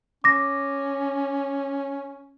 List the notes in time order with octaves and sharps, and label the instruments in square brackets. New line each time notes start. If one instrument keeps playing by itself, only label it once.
[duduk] C#4 [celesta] D6 A#6